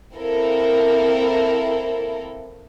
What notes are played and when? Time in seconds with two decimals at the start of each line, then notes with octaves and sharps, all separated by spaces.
0.15 A#3 C4 E4 A4 A#4